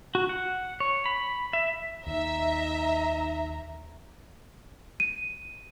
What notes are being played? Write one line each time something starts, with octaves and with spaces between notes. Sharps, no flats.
F#4
F#5
C#5
B5
E5
D#2 D#4 E5 A#5
D#7